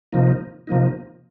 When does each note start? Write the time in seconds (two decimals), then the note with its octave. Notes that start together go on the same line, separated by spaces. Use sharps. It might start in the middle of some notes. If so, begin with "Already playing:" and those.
0.13 C3 F3 A#3 D#4
0.67 C3 F3 A#3 D#4